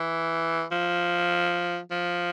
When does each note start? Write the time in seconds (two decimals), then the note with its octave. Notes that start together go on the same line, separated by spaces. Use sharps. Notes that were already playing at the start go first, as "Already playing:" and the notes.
Already playing: E3
0.72 F3
1.91 F3